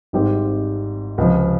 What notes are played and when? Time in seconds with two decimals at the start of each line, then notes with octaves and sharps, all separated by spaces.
0.13 G#1 G#2 G3 C4 G4
1.18 C#2 C3 F3